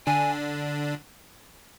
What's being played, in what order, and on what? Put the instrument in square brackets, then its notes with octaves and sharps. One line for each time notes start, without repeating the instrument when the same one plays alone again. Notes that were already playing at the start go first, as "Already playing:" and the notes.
[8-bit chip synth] D3 D4 [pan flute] G#5